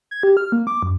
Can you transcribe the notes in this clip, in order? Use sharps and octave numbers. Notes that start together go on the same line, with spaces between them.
G#6
G4
F6
A#3
D6
F#2